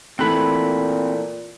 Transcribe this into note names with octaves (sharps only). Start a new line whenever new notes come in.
A#2 E3 A3 C4 B5 F#6